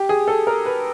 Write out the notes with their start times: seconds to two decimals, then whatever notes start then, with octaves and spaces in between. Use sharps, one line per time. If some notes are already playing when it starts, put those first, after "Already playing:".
Already playing: G4
0.09 G#4
0.28 A4
0.47 A#4
0.66 B4